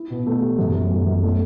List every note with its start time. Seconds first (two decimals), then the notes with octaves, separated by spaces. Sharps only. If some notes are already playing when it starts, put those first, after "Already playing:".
Already playing: E4
0.10 B2
0.27 A3
0.42 G4
0.59 F#2
0.74 A3
0.91 F#2
1.06 F#2
1.23 A3